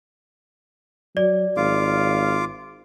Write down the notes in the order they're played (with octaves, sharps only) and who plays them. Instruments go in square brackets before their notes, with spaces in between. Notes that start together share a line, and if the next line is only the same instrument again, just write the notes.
[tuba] F#3 [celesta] D5
[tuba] G#1 [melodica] F4 F5 D6